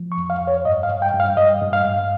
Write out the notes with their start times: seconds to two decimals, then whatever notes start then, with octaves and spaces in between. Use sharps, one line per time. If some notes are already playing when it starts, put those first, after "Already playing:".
Already playing: F3
0.12 C#6
0.17 F2
0.30 F5
0.41 F2
0.47 C#5
0.65 G2 D#5
0.83 F5
0.90 G2
1.02 G5
1.14 G2
1.20 F5
1.37 G2 D#5
1.62 G2
1.73 F5
1.85 G2